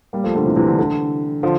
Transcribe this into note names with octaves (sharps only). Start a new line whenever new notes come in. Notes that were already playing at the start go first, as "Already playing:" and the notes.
G3 A#3
F3 A3
D3 F3
C3 E3
C3 E3
D3
D3
D3 F3